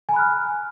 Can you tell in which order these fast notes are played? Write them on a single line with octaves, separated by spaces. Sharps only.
G#5 A#5 B5 F#6 F6